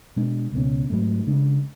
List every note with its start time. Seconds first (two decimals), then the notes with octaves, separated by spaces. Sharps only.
0.16 B2 G#3 D4
0.53 C#2 B2 A3 C#4
0.90 G#2 F#3 A3
1.27 C#3 G#3 D4